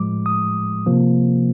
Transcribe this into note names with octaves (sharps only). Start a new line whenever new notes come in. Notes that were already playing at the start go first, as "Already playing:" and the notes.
Already playing: A2 F3 G#3 D6
D#6
C3 F3 A#3